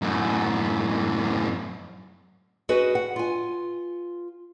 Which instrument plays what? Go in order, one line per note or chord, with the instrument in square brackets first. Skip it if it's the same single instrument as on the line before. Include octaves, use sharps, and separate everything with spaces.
[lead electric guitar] F#2 A2
[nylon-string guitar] C#4 F#4 G#4 B4 D#5
F#5
F4 G#5